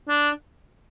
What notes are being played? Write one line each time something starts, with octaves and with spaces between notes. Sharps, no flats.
D4